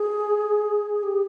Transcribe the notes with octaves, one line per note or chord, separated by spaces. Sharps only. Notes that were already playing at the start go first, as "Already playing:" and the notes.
Already playing: G#4
G4